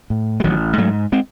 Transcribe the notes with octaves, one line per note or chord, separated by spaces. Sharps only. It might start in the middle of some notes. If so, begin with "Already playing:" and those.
A2
G#3
A1 D#3 F#3
G#3
G#2 F#3 A3
G#3 C4